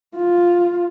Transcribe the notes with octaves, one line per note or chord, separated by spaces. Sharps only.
F4